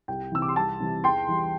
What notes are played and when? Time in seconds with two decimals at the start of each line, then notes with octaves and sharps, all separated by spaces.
0.08 C2 G5
0.32 C3 E3 E6
0.42 D6
0.48 C6
0.56 C2 A5
0.80 C3 E3 G3
1.04 E2 G5 C6
1.28 E3 G3